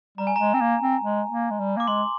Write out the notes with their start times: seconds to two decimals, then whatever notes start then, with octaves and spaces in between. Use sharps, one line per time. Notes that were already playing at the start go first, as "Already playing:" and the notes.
0.18 G3 A#5
0.27 G#5
0.36 G#3 A#5
0.54 C4
0.61 A#3
0.81 C4
1.03 G#3
1.31 A#3
1.51 G#3
1.60 G3
1.77 A#3 D6
1.88 G#3 C6